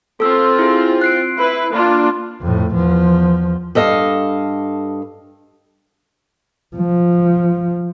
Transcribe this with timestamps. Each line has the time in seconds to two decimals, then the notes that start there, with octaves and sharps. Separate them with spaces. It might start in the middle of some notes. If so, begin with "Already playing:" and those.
0.20 C4 F4 A4 E6
0.59 E4 G#4
1.01 F#6 C7 D7
1.37 E4 B4
1.71 A#3 D4 F4
2.41 F2 A2
2.74 E2 F3
3.75 G2 A4 D#5 F5
6.76 F3